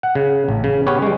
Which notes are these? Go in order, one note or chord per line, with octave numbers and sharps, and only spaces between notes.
F#5
C#3
A1
C#3
B3 C#4 G4 B4 C#5
G3 G#3